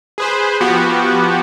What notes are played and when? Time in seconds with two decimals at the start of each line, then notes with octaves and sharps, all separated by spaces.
0.18 G#4 B4 C5
0.61 F3 B3 F#4 G4